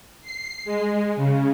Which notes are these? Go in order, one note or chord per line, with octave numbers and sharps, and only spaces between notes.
C7
G#3
C#3